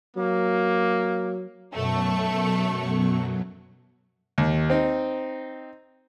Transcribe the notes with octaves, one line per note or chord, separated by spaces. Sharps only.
F#3 A#3
F#2 B2 F#3 A3 C#6
D#2
C4 D#4